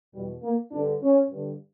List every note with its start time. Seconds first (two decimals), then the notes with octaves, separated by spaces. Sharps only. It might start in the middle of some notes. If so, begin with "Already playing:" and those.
0.12 E2 B2 G3
0.42 A#3
0.71 G2 D3 D4
1.00 C#4
1.30 G2 D3